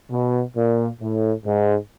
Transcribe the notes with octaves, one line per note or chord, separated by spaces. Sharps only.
B2
A#2
A2
G#2